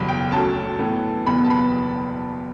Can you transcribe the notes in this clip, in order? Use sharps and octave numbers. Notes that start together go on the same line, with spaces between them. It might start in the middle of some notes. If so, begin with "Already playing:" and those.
Already playing: F#1 E2 B2 G3 B5
G5
D2 D3 F#3 C#4 A5
A2 E3 B3
F#1 E2 B2 G3 B3 B5
A5
B5